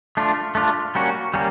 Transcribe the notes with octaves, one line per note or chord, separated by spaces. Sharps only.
A3 D4 F4
A3 D4 F4
G3 A#3 C#4 F#4
G3 A#3 C#4